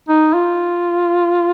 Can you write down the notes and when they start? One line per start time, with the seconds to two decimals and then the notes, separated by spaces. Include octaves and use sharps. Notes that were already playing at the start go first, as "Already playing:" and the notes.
0.09 D#4
0.34 F4